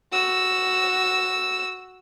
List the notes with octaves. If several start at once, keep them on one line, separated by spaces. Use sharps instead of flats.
F#4 E6